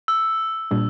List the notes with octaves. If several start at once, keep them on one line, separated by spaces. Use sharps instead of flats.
E6
A#2 G3 D4